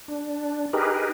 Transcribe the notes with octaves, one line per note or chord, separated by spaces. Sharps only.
D4
D#4 G4 G#4 A#4 B4